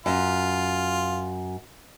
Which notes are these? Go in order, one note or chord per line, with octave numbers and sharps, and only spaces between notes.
F#2 F4